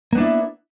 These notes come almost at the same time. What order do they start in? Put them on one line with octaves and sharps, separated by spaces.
A#3 B3 D4 E4